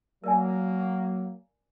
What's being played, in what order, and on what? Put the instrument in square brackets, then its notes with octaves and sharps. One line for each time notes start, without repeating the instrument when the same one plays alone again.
[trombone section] F#3 A#3 [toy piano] A#4 D5 G#5